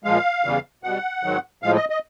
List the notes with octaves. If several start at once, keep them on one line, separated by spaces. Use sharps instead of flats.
A#2 F3 G#3 F5
E2 C#3 E3 G3
B2 G3 F#5
G#2 D#3 F#3
A2 F3 G#3 F5
D#5
D#5